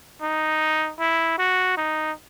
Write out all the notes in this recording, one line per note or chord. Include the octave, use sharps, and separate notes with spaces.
D#4
E4
F#4
D#4